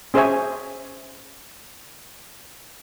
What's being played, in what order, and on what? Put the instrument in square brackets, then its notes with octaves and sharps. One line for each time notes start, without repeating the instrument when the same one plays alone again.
[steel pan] C#4 G#4 C5 C#5 E5 G#5